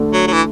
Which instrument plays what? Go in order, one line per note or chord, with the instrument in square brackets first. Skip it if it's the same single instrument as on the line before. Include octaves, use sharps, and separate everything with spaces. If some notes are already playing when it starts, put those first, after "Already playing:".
Already playing: [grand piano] D2 D3 A3 D4
[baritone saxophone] F#3
F#3
E3